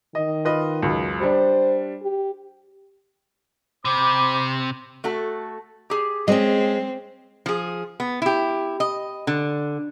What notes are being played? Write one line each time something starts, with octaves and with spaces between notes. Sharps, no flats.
D#3 D#5
F4 B4 D#5
C#2 F#2
G3 D4 C5
G4
C3 C5 B5 D6
A3 F#4 A4
G4 G#4
G#3 C4 C#4 G#4 D#5
F3 G#4
B3
E4 G4
D#5
D3